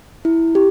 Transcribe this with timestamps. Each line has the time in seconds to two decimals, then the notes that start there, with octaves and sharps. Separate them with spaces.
0.25 E4
0.55 G4